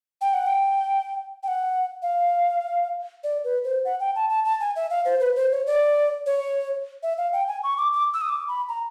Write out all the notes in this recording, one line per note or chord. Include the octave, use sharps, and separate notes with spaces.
G5
F#5
G5
G5
F#5
F5
D5
B4
C5
F#5
G5
A5
A5
A5
G#5
E5
F5
C5
B4
C5
C#5
D5
C#5
E5
F5
G5
G#5
C#6
D6
D6
E6
D#6
D6
B5
A#5